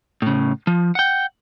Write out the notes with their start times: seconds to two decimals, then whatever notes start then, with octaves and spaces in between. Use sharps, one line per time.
0.22 A2 C#3
0.67 F3
0.95 F#5 G5